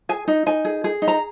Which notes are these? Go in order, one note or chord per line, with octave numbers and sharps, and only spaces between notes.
G#4 G#5
D#4
D#4 G#5
G#4
G#4
D#4
A#5